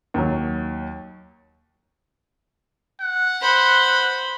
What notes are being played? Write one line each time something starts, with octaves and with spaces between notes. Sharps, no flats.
D#2 F#3
F#5
C5 B5